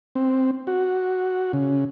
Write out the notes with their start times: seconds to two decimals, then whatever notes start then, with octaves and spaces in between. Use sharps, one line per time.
0.15 C4
0.67 F#4
1.53 C#3